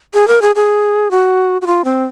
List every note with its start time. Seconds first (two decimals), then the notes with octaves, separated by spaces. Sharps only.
0.14 G#4
0.28 A#4
0.42 G#4
0.55 G#4
1.11 F#4
1.62 F#4
1.67 F4
1.84 C4